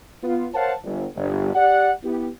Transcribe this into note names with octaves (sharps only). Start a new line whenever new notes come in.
B3 F4
A#4 C5 C#5 F5 F#5 A5
G1
G1 G2
G4 D5 F#5
B3 E4 G4